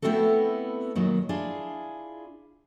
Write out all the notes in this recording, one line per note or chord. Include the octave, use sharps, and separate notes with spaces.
A3 B3 C4 E4 F#4 A4
D#2 A#2 D#3 F#3 A#3
D4 E4 F4 G#4